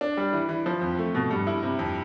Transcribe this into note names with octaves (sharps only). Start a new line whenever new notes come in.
D4
G3
E3
E3
F3
F2
A3
B2
G2
E4
C3
F2